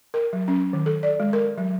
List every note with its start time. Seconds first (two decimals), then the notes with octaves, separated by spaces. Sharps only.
0.14 A#4
0.33 F#3
0.48 C#4
0.73 D#3
0.86 A4
1.03 D5
1.20 G#3
1.33 A#4
1.58 F#3